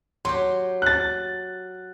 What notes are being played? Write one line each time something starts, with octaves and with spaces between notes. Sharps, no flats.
F#3 G4 C6
F#6 A6